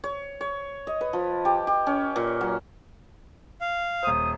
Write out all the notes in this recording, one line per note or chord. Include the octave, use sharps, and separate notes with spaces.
C#5
C#5
D#5
B4
F3
G4
G4
C#4
A#2
F#3
F5
D#1 C5 D#6